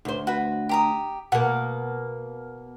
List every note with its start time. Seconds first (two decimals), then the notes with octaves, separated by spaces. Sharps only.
0.05 D2 C5
0.27 F#4 B4
0.69 G4 A#5 D#6
1.32 B2 A#3 F#5